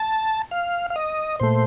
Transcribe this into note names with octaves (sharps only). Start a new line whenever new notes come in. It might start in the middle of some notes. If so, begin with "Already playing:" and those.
Already playing: A5
F5
F5
D#5
A#2 A3 C5